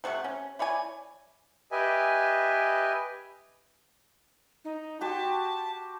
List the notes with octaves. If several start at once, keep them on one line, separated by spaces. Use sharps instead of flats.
C3 A3 F#5 C#6
C#4
E4 C#5 D5 G#5
G4 B4 D#5 E5 G#5
D#4
F#4 G4 C5 A5